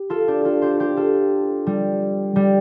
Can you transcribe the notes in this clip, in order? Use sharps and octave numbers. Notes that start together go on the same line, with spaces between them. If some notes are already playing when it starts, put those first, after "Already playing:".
Already playing: G4
F4 A4
D4 G4
F4 A4
G4 C5
G4 C5
F4 A4
G3
G3